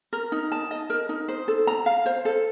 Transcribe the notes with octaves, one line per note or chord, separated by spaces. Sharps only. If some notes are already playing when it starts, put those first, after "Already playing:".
A#4
D#4
A5
D#5
A#4
D#4
C5
A4
A#5
F5
C5
A4